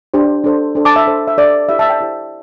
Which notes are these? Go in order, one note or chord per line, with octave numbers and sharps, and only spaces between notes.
D4 G4 C5
D4 A4 C5
D4 A4 C5
A5 D6
E5
D4 A4 C5
E5
D4 A4 C5 D5
E4 G4 C5 E5
E5 A5
D5 G5
E4 G4 C5